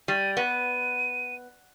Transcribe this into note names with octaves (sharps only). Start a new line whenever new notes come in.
G3 D#7
B3 D#7